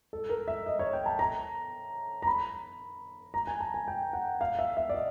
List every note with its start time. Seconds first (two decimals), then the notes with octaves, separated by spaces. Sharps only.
0.13 A4
0.30 A#4
0.48 E5
0.66 D#5
0.79 C#5
0.93 G5
1.06 A5
1.19 A#5
2.22 A#5
2.27 B5
3.34 A#5
3.47 G#5
3.60 A5
3.74 G#5
3.88 G5
4.13 F#5
4.41 F5
4.59 E5
4.77 E5
4.90 D5
4.94 D#5